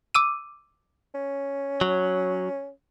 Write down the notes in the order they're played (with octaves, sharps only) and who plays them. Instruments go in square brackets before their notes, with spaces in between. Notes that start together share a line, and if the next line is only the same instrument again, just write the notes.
[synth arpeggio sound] D6 E6 D#7
[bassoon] C#4
[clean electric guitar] F#3